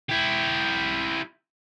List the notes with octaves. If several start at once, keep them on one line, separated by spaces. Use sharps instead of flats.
E4 G4